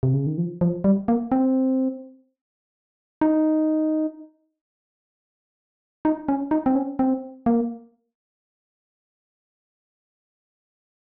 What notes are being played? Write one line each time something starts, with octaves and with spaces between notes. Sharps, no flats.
C3
C#3
D#3
F3
F3
G3
A#3
C4
D#4
D#4
C#4
D#4
C4
C#4
C4
A#3